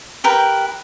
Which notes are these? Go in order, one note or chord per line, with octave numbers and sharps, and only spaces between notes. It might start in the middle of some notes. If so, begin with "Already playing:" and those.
G4 A#4 B4 G5